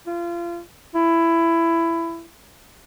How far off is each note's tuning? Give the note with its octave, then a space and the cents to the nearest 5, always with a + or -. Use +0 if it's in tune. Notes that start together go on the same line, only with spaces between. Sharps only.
F4 -30
E4 +15